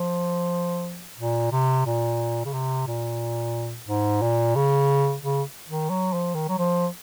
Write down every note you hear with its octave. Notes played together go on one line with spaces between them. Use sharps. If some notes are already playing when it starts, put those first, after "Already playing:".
Already playing: F3
A#2
C3
A#2
C#3
C3
A#2
G#2
A#2
C#3
C#3
D#3
F#3
F3
D#3
F#3
F3